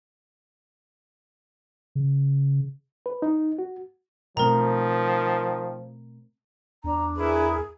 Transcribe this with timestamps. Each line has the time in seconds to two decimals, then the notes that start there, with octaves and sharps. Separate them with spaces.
1.95 C#3
3.06 B4
3.22 D#4
3.59 F#4
4.37 B2 D#3 F3 A3 C4 A#4 A#5
6.84 E2 D4 A#5
7.17 E4 G#4 A#4 B4